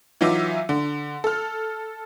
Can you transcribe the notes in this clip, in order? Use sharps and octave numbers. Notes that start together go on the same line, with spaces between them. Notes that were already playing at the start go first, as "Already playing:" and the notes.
E3 F#3 D#4 F4 E5 D6
D3
A4 F6